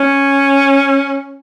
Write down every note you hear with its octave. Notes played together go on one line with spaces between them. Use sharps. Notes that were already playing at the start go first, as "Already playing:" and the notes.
Already playing: C#4